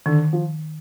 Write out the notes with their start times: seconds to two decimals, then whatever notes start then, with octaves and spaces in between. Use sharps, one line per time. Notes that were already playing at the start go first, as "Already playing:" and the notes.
0.06 D3 D#3
0.33 F3